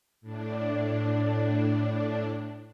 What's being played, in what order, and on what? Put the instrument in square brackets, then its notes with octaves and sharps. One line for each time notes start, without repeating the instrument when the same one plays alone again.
[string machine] A2 D4